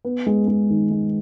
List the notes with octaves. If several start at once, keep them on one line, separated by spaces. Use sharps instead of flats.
B3
G#3
G#3
D#3
G#3